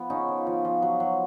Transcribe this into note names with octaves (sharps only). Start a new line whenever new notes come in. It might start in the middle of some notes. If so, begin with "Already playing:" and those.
Already playing: F3 B3
C#3 C#4 D#4
F3
F3
F3
F#3
F#3